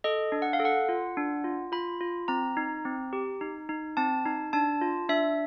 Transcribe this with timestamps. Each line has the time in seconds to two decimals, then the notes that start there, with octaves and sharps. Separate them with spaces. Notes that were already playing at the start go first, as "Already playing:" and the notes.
0.04 A4 D#5
0.32 D4
0.42 F#5
0.53 F5
0.60 A4
0.65 F#5
0.89 F4
1.17 D4
1.44 F4
1.72 F4 B5
2.01 F4
2.28 C4 A#5
2.57 D#4
2.85 C4
3.13 G4
3.41 D#4
3.69 D#4
3.97 C4 A5
4.26 D#4
4.53 D4 A5
4.81 F4
5.09 D4 E5